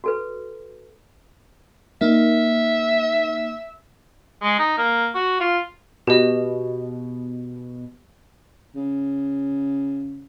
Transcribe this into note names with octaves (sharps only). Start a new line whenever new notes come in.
F#4 A4 B4
A#3 D#4 E5
G#3
D#4
A#3
F#4
F4
B2 G4 D#5
C#3